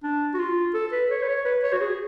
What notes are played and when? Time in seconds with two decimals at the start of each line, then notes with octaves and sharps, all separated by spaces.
0.04 D4
0.34 F#4
0.39 F4
0.74 A4
0.92 B4
1.10 C#5
1.23 B4
1.28 C#5
1.45 B4
1.63 C#5
1.73 F#4
1.81 G#4